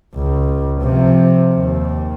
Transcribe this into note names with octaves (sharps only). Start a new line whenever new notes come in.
C#2
C3 F3
D#2